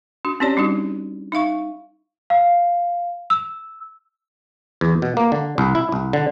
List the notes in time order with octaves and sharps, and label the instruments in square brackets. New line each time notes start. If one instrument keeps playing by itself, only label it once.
[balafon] D4 F#4
C4 C#4 E4 G4 C#5 D5
G3 D4 D#4 F#4
D#4 E5 F5 C#6
[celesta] F5
E6
[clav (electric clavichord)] E2
B2
A#3
D3
C2
E4
C2
D3